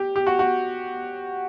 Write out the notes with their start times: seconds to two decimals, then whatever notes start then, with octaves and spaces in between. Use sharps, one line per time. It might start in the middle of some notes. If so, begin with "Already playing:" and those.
Already playing: G4
0.16 G4
0.27 F#4
0.39 F#4